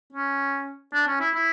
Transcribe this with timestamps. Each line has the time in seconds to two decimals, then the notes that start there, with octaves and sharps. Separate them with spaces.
0.13 C#4
0.93 D4
1.07 C#4
1.20 E4
1.34 E4